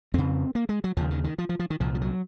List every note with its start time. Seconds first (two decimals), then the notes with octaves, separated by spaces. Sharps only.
0.14 F2 C#3 C4
0.55 A#3
0.69 G#3
0.84 F#3
0.97 D#2 C#3 F3
1.11 D#3
1.24 D#3
1.38 F3
1.49 F3
1.59 F3
1.70 D#3
1.80 C2 A#2 F3
1.95 F3
2.01 F#3